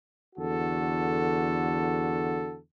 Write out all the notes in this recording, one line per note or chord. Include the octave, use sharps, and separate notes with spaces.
E2 D3 F#4 A4